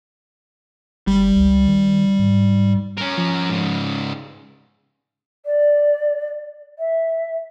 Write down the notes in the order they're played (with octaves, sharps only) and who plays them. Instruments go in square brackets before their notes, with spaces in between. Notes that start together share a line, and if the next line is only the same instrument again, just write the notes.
[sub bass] G1 [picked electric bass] G3
[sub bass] C#2
D#3
G#2
[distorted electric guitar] C#4 A#4
[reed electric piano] F3
[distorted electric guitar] G#2 C#3
[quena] D5
E5